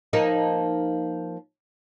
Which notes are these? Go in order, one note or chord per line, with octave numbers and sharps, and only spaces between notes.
F3 A#3 D#4